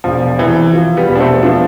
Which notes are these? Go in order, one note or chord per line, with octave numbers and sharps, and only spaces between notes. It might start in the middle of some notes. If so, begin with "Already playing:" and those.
E1 F3
C3 E3
F3
G3 B3
E1
D4
A3 C4
F3 B3 D4